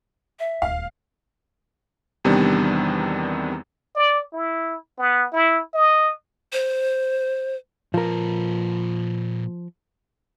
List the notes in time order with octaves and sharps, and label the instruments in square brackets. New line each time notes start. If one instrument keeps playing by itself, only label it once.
[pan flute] E5
[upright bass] D#1 D2 [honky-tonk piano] F5
[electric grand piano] E2 C3 D#3 G3 B3 D4
[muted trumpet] D5
E4
B3
E4
D#5
[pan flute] C5
[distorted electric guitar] A#2 B4 [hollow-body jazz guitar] F3 A#4